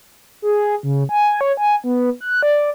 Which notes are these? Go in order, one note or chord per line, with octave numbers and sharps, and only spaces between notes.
G#4
C#3
G#5
C#5
G#5
B3
F#6
D5